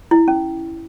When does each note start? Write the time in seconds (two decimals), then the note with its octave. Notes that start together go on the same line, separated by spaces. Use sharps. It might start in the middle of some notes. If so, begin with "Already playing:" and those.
0.11 E4
0.28 C#4